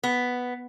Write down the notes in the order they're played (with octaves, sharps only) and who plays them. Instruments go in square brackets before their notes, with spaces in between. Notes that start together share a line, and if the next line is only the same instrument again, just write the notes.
[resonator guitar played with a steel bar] B3